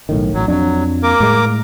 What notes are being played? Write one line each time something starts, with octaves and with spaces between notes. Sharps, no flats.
B1 A2 D#3
A1 F#3
F2 F#3 D4
A#3 A#4 D6
A2 G#3